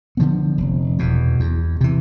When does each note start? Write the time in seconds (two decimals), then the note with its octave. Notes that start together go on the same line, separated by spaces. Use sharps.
0.17 D3 F3 B3
0.58 F1
0.99 E2 B2
1.40 E2
1.81 C3 E3